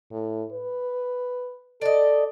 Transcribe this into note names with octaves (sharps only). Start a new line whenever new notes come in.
A2
B4
A4 D5 D#5